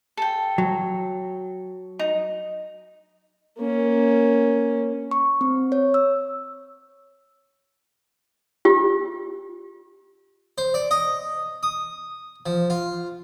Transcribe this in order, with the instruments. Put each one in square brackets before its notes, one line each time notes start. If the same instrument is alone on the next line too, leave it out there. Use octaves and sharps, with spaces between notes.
[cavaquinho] A4 G5
[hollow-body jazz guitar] F#3
[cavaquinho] D#4
[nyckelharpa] A#3 C#4
[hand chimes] C#6
C4
C#5
E6
[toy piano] F4 G4
[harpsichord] C5
D5
D#5
D#6
F3
F4